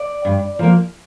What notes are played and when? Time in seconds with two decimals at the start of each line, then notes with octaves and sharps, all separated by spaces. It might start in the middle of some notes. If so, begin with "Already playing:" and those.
Already playing: D5
0.25 G2
0.59 F3 A#3